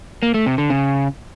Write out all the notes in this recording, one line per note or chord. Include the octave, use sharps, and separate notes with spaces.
A#3
A3
C3
D3
C#3